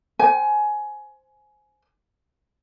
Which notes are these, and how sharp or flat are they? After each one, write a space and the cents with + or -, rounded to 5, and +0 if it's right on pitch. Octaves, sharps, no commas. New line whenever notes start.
C5 +0 G#5 +20